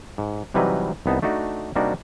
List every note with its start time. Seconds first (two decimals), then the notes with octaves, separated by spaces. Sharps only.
0.18 G#2
0.54 C3 E3 F#3 G3 D#4 B4
1.06 C2 B3 D#4 A5
1.22 A3 D4 D#4 F#4
1.76 C3 G3 A#3 D4 D#4 F#4